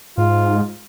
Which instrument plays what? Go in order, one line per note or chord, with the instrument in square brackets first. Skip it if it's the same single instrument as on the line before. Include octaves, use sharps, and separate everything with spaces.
[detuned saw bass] G#2 [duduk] F4